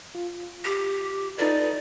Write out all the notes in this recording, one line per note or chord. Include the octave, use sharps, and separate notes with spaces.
F4
G4
D#4 F4 A4 B4 D5